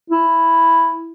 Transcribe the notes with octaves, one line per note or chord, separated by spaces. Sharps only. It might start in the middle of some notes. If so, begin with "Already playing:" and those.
E4